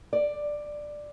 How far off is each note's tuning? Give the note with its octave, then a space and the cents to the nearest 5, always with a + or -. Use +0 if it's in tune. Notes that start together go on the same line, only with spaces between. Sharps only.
D5 +10